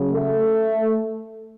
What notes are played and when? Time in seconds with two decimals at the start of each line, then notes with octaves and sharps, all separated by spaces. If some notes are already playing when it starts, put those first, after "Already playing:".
Already playing: C#3 F#3
0.12 A3